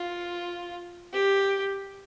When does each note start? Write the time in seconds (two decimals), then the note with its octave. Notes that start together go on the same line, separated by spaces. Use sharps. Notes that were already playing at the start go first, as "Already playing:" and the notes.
Already playing: F4
1.13 G4